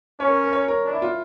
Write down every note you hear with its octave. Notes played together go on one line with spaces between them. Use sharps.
C#4 C#5
A#4
A#4
C#5
A#4
D4
E4
F4